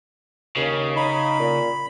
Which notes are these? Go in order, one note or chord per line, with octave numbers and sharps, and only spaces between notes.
D#2 C#3
D#4 B5
A#2